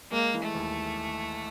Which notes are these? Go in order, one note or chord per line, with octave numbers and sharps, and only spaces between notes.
G#3 A#3
E3
A3
D#2